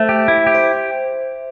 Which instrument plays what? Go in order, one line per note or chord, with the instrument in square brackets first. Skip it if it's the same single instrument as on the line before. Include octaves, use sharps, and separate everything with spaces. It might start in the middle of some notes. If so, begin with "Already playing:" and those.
Already playing: [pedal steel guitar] A3 [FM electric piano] C5 E5
[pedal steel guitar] G4
E4
G4
[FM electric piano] C5